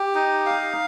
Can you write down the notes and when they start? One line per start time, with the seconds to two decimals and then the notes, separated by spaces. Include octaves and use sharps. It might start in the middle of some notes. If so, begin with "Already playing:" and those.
Already playing: G4
0.15 D#4
0.46 F5